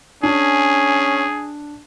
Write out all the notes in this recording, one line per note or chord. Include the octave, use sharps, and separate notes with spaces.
C#4 D4 G#4